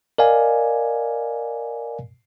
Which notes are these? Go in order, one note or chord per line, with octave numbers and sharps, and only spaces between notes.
A#4 D5 D#5 F5 G#5